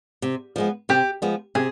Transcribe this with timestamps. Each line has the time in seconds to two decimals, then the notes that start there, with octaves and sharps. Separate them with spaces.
0.22 C3
0.56 F3 G#3 B3
0.89 C3 G4
1.22 F3 G#3 B3
1.55 C3 G#4